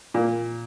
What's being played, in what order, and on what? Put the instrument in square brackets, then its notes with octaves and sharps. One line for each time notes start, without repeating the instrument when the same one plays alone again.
[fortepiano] A#2 [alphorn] A#3